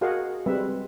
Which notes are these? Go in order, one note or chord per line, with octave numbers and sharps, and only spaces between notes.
F#4 G#4 A#4 D#5 F5 F#5
G3 G#3 C4 B4 E5